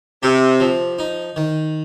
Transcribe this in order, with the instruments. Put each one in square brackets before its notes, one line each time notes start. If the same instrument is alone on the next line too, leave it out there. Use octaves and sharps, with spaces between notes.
[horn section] C3 [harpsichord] G4
[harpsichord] F3
D#4
D#3